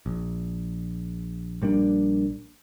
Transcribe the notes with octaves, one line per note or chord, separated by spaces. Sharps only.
A#1
A#1 G3 A#3 D4